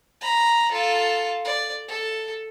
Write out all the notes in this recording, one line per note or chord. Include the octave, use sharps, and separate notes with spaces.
A#5 B5
F4 A4
D5
A4